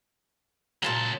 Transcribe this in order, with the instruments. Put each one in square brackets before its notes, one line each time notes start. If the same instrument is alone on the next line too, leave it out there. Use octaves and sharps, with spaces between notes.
[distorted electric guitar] C#2 A5 [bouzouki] A#2 C#3 F#3